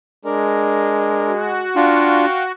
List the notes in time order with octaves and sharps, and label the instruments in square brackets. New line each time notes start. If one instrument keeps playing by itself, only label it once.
[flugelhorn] G#3 [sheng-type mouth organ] D4 A#4
[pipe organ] F#4
[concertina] D4 F4 [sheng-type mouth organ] F5 G5 C#6